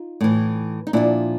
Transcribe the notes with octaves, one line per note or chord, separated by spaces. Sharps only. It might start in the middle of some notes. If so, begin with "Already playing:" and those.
Already playing: D#4 F4
A2 E3
D#4
A#2 F3 D4 E4